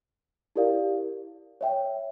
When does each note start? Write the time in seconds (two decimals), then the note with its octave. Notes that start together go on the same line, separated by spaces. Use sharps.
0.56 E4 G4 A#4 D5 F5
1.61 C#5 E5 G5